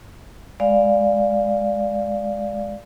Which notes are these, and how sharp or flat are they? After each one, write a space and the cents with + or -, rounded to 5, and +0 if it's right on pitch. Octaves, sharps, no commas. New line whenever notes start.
G#3 -5 D5 +0 F5 +0